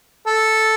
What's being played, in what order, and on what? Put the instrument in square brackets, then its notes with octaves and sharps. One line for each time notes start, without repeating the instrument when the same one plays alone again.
[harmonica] A4